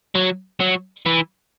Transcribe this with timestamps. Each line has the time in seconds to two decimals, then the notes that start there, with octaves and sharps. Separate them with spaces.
0.15 F#3
0.60 F#3
1.06 E3